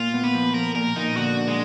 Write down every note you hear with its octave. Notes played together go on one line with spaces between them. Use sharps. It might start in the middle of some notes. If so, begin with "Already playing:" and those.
Already playing: A#2 F4
B3
B4
F3
F3 A#4
A#2 A#4
A#2 D#4
D3 F#4
D4
G#3